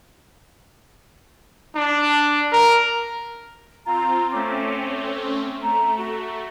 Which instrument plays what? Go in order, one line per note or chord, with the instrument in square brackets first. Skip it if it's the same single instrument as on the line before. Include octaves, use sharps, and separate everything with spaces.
[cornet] D4
A#4
[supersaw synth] C4 F4 [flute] A#5
[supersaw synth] A3 C4 C#4 [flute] D6
[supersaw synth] A3 [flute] A#5
[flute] F#4